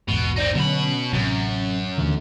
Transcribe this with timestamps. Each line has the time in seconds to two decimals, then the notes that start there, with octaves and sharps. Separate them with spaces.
0.08 A#1 E2 G#2 B2
0.37 C4 D#4 D5
0.56 B2 D3 F#3 C#4 B5
1.13 A1 F#2 C3
1.98 D#2 D3 E3 A3